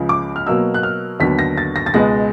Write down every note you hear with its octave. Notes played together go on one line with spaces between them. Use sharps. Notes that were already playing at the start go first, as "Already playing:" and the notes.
Already playing: C#2 C#3 F3
D6
F6
B2 F#3 A#3 E6
F#6
F6
D#2 D3 F#3 B3 B6
A#6
A6
A#6
A6
C#2 B2 G#3 B3 A#6